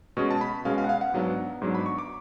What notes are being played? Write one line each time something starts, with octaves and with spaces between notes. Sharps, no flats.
B2 G#3 C#4 C#6
A5
B5
B2 G#3 C#4 F5
F5
F#5
F5
F#5
G#2 F#3 B3 D4
G#2 F#3 B3 D4
B5
C#6
D6